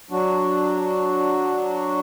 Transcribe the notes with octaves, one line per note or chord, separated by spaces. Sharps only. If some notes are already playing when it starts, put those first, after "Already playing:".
F#3 D4 F#4